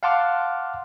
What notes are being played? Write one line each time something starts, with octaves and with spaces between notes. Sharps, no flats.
F5 F#5 A5 C6 D6 F6